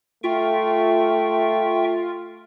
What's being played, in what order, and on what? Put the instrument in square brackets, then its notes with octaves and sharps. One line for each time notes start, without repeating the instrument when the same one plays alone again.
[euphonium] A3 [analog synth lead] F4 [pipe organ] E5 G5 C#6